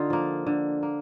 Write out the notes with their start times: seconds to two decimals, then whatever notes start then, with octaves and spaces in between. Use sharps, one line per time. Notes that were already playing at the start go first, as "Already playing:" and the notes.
Already playing: D3 D#4 F4
0.10 F3 A#3
0.47 D3
0.83 A#3